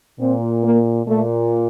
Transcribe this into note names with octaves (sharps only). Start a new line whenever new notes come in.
A#2 C4
A#3
A#2 A3